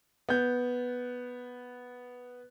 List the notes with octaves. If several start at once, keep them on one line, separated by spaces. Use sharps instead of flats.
B3 G6